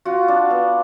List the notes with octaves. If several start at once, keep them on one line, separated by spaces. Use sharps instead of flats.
F4 F#4
D4
B3